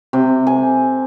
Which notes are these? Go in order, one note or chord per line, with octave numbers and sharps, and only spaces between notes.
C3
G#5